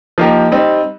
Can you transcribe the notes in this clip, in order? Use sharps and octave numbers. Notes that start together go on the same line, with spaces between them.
F3 A#3 D#4 G4 A#4
G3 C4 D#4